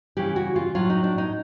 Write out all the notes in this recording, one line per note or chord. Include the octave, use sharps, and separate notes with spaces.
C#3 E3 G3 G4
F#4
F4
A2 F#3 F4
D#4
D4
D#4